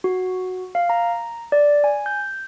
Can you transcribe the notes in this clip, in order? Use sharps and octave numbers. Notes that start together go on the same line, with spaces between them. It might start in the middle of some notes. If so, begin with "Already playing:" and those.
F#4
F5
A#5
D5
G#5
G6